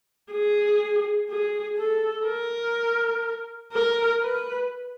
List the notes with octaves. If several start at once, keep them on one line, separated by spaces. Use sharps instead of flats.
G#4
G#4
A4
A#4
A#4
B4